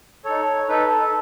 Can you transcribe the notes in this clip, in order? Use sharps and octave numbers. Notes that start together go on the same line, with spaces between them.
D#4 A4 C#5
D#4 A4 B4
A4